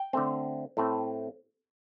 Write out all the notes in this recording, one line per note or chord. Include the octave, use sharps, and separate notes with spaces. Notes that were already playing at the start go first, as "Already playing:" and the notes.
Already playing: G5
D3 A3 C4
A2 A3 C4